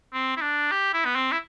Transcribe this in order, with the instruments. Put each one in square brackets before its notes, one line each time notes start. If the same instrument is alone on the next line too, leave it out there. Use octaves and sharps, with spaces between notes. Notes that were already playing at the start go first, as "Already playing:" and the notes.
[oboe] C4
E4
D4
G4
E4
B3
C4
E4